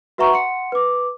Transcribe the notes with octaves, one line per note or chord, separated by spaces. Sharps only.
F#4 B4 E5 F#5 A#5 C#6
F#5 C6 C#7
B4 D6